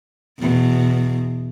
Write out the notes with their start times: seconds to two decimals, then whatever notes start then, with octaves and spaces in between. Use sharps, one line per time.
0.40 E2 B2